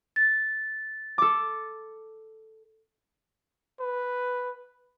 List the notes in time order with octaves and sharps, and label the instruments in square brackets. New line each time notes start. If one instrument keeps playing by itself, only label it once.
[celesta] A6
[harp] A4 D6
[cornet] B4